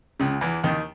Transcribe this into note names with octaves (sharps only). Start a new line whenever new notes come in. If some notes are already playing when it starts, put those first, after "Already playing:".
C#2 C#3
E2 E3
D#2 D#3